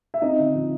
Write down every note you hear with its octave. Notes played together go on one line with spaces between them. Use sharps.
E5
C4 D#4 D#5
D3
F3